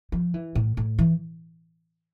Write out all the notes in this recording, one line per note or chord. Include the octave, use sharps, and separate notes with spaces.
F3
E3
A2
A2
E3